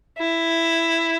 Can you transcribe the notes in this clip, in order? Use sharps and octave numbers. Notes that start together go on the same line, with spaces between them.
E4